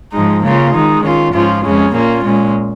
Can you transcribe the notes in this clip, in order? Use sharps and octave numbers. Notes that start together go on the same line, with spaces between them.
G#2 F3 G#3 D#4
C#3 A#3 C#4 F4
D#3 G#3 D#4
D#3 C#4 F4
G#2 F3 C#4 F4
F2 C#3 G#3 C#4
A#2 A#3 C#4 F4
A#2 G#3 C#4